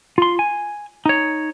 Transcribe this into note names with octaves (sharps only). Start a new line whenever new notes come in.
F4 C6
G#5
D#4 C#5